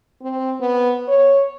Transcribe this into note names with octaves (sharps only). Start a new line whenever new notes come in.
C4
B3
C#5